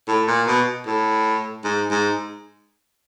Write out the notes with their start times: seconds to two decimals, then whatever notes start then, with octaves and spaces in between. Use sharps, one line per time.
0.08 A2
0.28 A#2
0.47 B2
0.86 A2
1.64 G#2
1.91 G#2